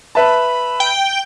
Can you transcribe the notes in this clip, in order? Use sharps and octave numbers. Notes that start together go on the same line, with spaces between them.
B4 E5 A5 B5
G5